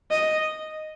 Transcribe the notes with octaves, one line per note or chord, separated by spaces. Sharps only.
D#5